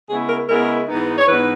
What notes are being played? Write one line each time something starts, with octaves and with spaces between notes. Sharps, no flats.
C#3 G#3 B3 E4 G#4
A#4
C#3 G#3 B3 E4 A#4
G#2 E3 B3 D#4
C#5
G#2 E3 B3 D#4 B4